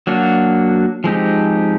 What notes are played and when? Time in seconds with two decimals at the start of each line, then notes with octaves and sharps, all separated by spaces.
0.07 F#3 A#3 D4 F#4
1.04 F3 G#3 C4 D#4 G4